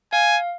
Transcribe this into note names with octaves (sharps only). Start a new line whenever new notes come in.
F5 G#5